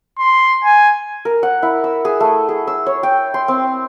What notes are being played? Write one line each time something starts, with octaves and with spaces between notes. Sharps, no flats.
C6
G#5
A#4
F#5
E4
E6
G#4
A3
G#4
E6
C#5
G5
C6
C4